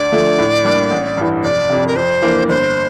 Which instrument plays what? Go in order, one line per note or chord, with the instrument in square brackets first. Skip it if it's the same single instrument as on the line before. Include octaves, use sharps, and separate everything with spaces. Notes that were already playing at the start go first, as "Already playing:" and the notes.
Already playing: [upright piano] D2 [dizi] D5
[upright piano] D3 F3 A3
A2
G3 A#3 D4
A1
G2 E3
[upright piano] F1 [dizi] D5
[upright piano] F2 C3
[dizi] A#4
[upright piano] F2 [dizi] C5
[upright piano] E3 A#3 D4
[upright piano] G1 [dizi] C5